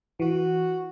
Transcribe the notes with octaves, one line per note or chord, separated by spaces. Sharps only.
E3 F#4